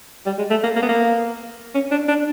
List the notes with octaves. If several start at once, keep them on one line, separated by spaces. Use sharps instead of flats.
G3
G#3
A3
A#3
A#3
B3
A#3
C#4
D4
D4